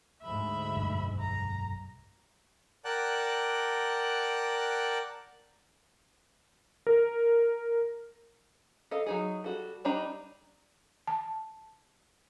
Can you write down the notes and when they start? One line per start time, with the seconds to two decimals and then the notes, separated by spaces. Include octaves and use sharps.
0.22 D2 G#2 E5 B5
0.75 F1 B1 G2
1.19 A#5
2.85 A#4 D5 F#5 G5 A5 F#6
6.87 A#4
8.91 A4 D#5 F5
9.06 F#3 D#4 G#4
9.44 G3 F#4 A4
9.85 G3 D4 D#4 A#5
11.07 A5